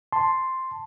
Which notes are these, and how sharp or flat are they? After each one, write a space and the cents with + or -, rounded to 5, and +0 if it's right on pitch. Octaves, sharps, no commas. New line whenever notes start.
A5 +0 C6 +0